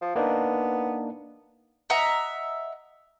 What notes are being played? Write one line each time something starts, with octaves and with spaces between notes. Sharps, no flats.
F3
A#3 B3 D4 D#4
D#5 E5 F#5 A#5